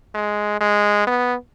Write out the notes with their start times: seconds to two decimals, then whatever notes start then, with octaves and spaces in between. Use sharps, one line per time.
0.15 G#3
0.61 G#3
1.07 B3